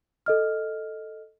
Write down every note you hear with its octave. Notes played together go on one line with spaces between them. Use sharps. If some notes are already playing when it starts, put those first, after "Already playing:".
A4 D#5 F6